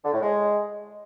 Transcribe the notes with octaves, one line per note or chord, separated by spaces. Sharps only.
D3
A2
G#3